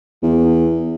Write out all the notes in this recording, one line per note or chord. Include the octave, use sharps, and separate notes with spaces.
E2